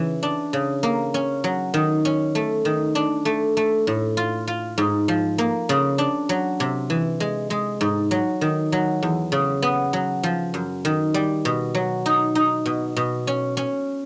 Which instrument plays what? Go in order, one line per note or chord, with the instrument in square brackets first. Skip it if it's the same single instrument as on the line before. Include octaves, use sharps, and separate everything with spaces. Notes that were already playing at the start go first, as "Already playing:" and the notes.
Already playing: [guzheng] C#3 E3
D4
C#3
A#3
C#4
F#3
D#3
C#4
A3
D#3
D4
A3
A3
A2
F4
F4
G#2
F3
A#3
C#3
D4
F#3
C3
E3
G#3
G#3
G#2
F#3
D#3
F#3
E2
C#3
B3
F#3
F3
F#2
D#3
G3
B2
F#3
D#4
D#4
B2
B2
C#4
C#4